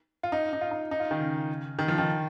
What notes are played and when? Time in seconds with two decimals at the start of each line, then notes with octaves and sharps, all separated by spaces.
0.23 F4
0.32 D#4
0.53 D#4
0.61 F4
0.71 D#4
0.91 D#4
1.00 F4
1.11 D#3
1.20 C#3
1.79 D#3
1.88 F3
1.98 D#3